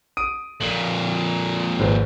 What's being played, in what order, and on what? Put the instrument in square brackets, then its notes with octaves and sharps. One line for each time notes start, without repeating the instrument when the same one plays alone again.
[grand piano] D#6 D7 D#7
[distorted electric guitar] F2 A#2 [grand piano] F#7
[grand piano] G#1 B4 C5